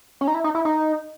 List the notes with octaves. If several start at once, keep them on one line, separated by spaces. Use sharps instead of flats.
C#4
D#4
E4
D#4
E4
D#4